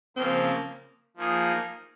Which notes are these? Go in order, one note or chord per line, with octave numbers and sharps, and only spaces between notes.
C#3 F3 A#3 C4
F3 A#3 D#4 G#4